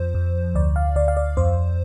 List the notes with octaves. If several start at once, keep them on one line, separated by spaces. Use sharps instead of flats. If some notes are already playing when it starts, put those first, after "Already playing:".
Already playing: F2 F3 C5
F2
D2 D5
F5
D2 D5
F5
D5
F2 C5